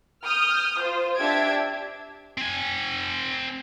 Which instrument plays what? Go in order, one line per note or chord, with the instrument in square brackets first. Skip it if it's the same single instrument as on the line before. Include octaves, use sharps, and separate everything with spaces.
[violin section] D#6 F6 G6
F4 C5
D4 G4 E5 G#6 D7
[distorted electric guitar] C4 G#5